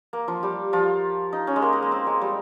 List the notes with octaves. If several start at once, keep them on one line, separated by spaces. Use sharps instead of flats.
A#3
F3 F4
G3 G4
F3 F4
D#4
C#4
G#3
A#3
G#3
A#3
C4
G#3
G3